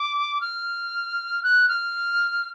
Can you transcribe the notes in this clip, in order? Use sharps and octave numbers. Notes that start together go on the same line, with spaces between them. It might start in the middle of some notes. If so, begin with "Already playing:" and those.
Already playing: D6
F6
F#6
F6